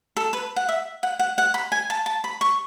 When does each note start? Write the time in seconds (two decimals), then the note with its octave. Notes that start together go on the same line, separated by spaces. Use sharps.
0.17 A4
0.33 B4
0.56 F#5
0.69 E5
1.03 F#5
1.19 F#5
1.38 F#5
1.54 B5
1.72 G#5
1.90 A5
2.06 A5
2.24 B5
2.41 C#6